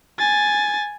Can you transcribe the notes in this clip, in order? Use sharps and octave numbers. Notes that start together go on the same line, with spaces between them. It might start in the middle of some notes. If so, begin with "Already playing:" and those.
G#5 A6